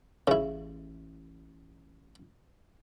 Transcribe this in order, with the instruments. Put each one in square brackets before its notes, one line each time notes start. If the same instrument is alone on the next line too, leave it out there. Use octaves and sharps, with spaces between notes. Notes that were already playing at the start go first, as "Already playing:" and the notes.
[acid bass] A1 [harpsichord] C#3 E4